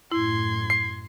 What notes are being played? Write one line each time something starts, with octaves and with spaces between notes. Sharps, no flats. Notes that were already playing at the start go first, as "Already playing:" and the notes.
F#2 A2 E4 C6 G#6
C7